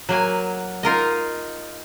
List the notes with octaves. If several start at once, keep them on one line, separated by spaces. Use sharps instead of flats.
F#3 A#3 G#5
D#4 F4 A#4 D#5